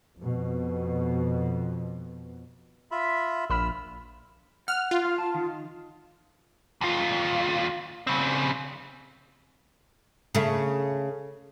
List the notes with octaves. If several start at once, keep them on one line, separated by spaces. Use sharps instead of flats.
F2 B2
F4 E5 B5
A#1 B5 E6 F6
F#5 F6
F4
F5
A5
D#3
D#2 F4
C#3 C4
C#3 A3